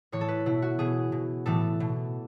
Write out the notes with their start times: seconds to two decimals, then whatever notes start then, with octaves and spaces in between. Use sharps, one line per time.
0.12 A2 E3 C#5
0.21 A4
0.28 B4
0.46 B2 E4
0.62 F#4
0.79 B2 G#4
1.12 B2
1.46 A2 E3 A4
1.80 B2